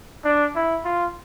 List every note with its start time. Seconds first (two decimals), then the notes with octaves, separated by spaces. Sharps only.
0.24 D4
0.55 E4
0.85 F4